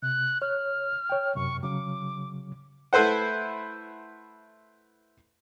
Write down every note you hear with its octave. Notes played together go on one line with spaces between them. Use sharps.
C3 F#6
C#5 F6
C#5 G5
F#2 C3 C#6
C#3 F#3 D6
A3 E4 B4 C5 F#5